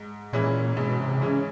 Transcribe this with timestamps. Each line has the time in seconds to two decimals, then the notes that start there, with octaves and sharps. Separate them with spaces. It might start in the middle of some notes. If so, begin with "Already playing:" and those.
Already playing: G#2
0.33 A#2 E3 G#3 C#4 E4
0.77 G#2 B2
1.00 C3
1.21 C#3 E3 G#3 C#4 E4